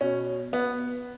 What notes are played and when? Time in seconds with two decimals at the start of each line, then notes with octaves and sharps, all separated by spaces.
0.01 B2 C#4
0.53 B3